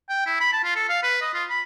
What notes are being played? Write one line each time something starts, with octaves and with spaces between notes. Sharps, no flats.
G5
E4
B5
A5
F4
A4
F5
B4
D#5
F4
B5